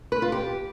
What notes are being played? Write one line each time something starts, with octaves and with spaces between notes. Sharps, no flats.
B4
F4
G4